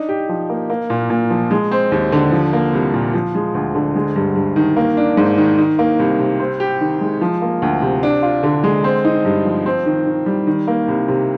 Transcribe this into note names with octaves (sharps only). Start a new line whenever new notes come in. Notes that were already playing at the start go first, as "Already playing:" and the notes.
Already playing: D4 D#4
G4
F3
A#3
A#3
A#2
A#2
F3
G#3
C4
D#2
D3
F3
A#3
C2
A#2
F3
G#3
D2
D3
G#3
G2
G2
D#3
A#3
D4
G#2
D#3
D#3
A#3
C2
C3
C4
G4
D#3
G#3
F3
A#3
D2
C3
D4
F4
D3
G#3
C4
D#4
G2
F3
C4
D#3
D#3
G3
D#3
A#3
C2
C3